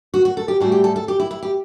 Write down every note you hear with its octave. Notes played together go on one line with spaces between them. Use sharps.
F#4
F#4
A4
G4
A2 E3 G3 F#4
G4
A4
A4
G4
E4
E4
G4